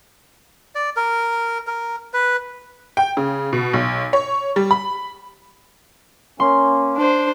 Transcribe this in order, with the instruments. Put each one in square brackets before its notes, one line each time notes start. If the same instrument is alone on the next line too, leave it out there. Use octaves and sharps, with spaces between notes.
[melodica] D5
A#4
A#4
B4
[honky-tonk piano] G5
C#3
B2
B1
C#5
G3
B5
[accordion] A#3 C#4 [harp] C6
[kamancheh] D4 C5